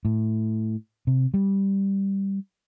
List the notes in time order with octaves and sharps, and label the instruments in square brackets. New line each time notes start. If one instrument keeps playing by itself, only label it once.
[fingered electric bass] A2
C3
G3